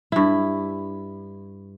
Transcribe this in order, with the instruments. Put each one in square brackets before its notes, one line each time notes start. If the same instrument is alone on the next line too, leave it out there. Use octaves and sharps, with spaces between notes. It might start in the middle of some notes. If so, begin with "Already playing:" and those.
[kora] G2 E4